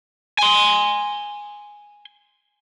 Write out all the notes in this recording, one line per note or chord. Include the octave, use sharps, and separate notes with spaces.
G#5 C6